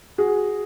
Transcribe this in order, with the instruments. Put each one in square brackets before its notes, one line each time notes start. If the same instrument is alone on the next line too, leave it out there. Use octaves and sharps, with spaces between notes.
[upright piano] F#4 G#4